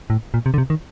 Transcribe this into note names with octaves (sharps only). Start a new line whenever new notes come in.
A2
A#2
C3
D3
C3
D#3